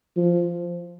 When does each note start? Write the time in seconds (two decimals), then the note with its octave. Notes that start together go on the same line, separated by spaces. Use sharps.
0.17 F3